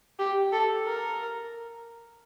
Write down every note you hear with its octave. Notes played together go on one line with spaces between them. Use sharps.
G4
A4
A#4